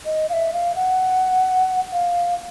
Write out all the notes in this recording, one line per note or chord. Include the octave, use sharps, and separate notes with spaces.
D#5
F5
E5
F5
F#5
F5